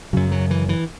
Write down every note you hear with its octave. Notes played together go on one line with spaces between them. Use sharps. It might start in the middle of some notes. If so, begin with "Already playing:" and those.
F#2 C#3 F#3
F#3
E3
E3